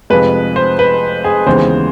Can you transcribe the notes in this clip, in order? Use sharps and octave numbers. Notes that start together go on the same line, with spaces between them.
F1 F2 C3 F3 G#3 B4
C5
B4
G#4
D#2 C#3 E3 G#3 B3 C5